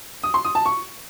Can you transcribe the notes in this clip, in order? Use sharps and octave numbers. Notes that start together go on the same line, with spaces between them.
D#6
C6
D#6
A5
C#6